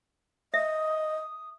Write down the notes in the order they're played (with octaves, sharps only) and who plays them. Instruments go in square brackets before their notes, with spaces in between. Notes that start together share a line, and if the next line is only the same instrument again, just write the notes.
[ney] D#5 [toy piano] E5 [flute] D#6